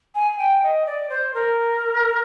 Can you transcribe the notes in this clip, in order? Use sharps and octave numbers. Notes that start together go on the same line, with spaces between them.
G#5
G5
D#5
D5
C5
A#4